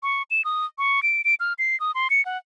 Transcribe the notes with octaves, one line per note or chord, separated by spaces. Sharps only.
C#6
E7
D#6
C#6
D7
D7
F6
C7
D#6
C6
C#7
F#5